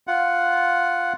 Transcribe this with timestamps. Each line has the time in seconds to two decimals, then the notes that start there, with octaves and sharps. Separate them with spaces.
0.07 F4 F#5